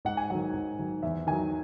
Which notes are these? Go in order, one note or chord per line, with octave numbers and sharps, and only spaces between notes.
G#2 F#5
G#5
D#3 F#3 F#5
G#2
D#3 F#3
E2 E5
D#3 F#3 G#5